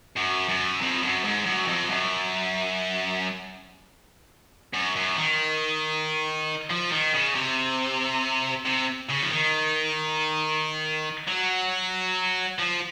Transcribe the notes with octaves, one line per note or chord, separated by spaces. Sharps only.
F#2
F#2
F2
F#2
G#2
F#2
F2
F#2
F#2
F#2
D#3
F3
D#3
C#3
C3
C3
C#3
F3
D#3
F#3
F3